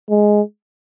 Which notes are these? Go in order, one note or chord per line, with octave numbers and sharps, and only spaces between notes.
G#3